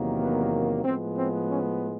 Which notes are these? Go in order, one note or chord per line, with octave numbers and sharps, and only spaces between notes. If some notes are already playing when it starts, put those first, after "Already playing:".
Already playing: E2 C3 D#3 F#3 A#3
B3
A2 F3 G#3 B3 C4
C4
C#4